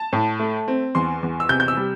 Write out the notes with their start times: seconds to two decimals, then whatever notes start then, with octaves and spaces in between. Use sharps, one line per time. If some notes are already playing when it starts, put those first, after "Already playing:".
Already playing: A5
0.13 A2
0.40 A3
0.68 C4
0.95 E2 C6
1.23 E2
1.40 E6
1.49 C3 G6
1.60 G6
1.68 E6
1.77 G3